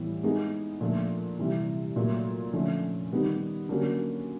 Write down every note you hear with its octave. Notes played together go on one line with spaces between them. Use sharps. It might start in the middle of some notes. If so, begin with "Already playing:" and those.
Already playing: A2 E3 G3 B3
G#3 B3 D#4 G#4
A#2 F3 A3 D4
C3 E3 G3 C4
A#2 F#3 A3
D3 F3 A3 C#4
D#3 G3 B3 D#4
D3 F#3 A#3 C#4 F#4